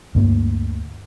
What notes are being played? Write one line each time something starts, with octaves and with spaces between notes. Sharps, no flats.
D2 G2 A#3